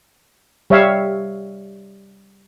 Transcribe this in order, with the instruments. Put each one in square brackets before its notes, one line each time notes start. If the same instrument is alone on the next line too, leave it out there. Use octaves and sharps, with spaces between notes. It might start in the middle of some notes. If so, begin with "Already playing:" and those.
[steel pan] G3 C#5 E5 F5